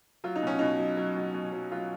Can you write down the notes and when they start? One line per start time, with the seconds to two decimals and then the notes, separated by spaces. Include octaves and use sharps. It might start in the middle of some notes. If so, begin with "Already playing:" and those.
0.24 F#3 F4
0.36 D#4
0.43 B2 C#4
0.59 B2 D#4
0.79 F#3
0.97 F#3
1.16 B2
1.34 B2
1.52 F#3
1.72 F#3 F4